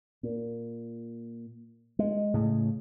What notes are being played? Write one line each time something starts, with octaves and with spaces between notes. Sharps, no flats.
A#2
G#3
A2 C#3